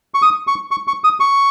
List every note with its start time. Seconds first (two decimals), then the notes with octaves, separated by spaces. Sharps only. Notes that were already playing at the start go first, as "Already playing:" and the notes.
0.14 C#6
0.22 D#6
0.47 C#6
0.71 C#6
0.88 C#6
1.04 D#6
1.20 C#6